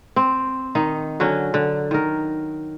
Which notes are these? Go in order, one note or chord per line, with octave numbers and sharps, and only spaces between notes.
C4
D#3 D#4
D3 F#3 C#4
D3
D#3 A#4